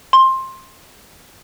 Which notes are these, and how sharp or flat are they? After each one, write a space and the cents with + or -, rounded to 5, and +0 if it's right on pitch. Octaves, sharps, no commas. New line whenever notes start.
C6 +15